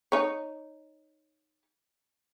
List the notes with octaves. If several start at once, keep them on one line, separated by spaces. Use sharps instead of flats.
D#4 C#5